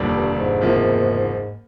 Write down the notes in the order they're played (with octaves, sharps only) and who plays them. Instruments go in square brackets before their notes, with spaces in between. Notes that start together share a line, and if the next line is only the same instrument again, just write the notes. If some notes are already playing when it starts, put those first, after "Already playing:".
Already playing: [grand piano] F1 D#2 D3 G3
[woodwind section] G2
G2
G#2
[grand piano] F#1 E2 C3 F3 A#3